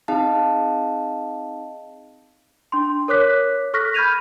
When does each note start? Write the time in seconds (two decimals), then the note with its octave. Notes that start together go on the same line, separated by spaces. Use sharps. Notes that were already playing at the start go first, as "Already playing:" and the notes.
0.08 C4 D#4 G#4 D#5 F5 A5
2.72 D4 C6
3.08 A#4 C#5 D6 F#6 B6
3.74 A4 C#6 F6 F#6 A#6 B6
3.94 B5 F6 G6 G#6 D#7 F7